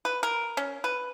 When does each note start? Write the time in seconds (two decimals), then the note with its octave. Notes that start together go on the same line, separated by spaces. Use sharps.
0.05 B4
0.23 A#4
0.57 C#4
0.84 B4